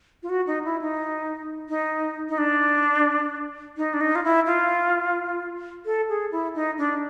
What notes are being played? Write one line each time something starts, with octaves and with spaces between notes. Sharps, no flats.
F4
F#4
D#4
E4
D#4
D#4
D#4
D4
D#4
D4
D#4
F4
E4
F4
A4
G#4
E4
D#4
D4